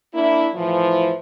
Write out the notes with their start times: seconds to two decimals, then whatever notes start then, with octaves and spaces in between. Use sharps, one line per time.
0.15 A#3 D4 E4
0.55 A2 E3 F3